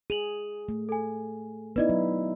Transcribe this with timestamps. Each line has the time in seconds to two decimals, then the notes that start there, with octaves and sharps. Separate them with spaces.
0.10 G#4 D#7 F7 F#7
0.69 A3
0.89 A4 G#5
1.76 B3 D#4 E4 B4 D5 D#5
1.89 F#3